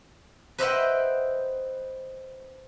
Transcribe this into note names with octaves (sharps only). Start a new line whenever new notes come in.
B4 C5 D#5 E5 F#5 G5